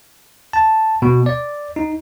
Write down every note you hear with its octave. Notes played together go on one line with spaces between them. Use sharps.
A5
B2
D5
D#4